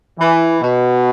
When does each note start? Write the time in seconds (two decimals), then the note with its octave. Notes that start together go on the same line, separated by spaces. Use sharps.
0.18 E3
0.61 B2